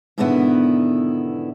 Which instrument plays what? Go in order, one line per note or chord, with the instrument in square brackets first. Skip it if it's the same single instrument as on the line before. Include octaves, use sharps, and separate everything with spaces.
[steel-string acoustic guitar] G#2 B2 D3 D#3 B3 E4